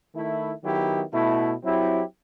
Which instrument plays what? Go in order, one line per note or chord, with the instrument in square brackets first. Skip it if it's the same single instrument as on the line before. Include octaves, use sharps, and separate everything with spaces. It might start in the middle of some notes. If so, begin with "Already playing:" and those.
[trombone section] D#3 A3 E4
D#3 F#3 B3 E4 G4
B2 A3 E4
F#3 C4 E4 G4